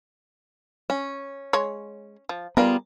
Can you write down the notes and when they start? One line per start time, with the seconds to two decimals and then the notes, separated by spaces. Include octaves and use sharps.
0.90 C#4
1.53 G#3 C#5
2.29 F3
2.57 G3 B3 F4 G#4 A#4